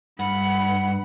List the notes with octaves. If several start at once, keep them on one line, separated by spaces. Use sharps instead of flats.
G2 F#5 B5